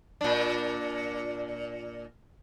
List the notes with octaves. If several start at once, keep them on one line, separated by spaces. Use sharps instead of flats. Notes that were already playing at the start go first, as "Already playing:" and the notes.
A#2 D4